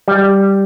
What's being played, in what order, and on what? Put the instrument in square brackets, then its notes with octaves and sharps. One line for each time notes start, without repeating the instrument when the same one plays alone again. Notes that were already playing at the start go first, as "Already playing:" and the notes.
[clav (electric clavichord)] G3